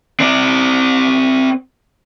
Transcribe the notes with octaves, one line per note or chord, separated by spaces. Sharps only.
C4 D5